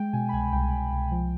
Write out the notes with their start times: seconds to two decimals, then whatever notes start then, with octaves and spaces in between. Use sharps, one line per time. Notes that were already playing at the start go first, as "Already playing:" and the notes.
Already playing: G#3 G5
0.13 B2 G#5
0.29 B5
0.33 C2 G#5
0.53 C2 G5
0.73 C2
0.92 C2
1.11 F3